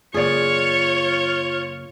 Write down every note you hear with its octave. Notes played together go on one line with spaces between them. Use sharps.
F#2 C#3 A#3 F4 G#4 C#5 D5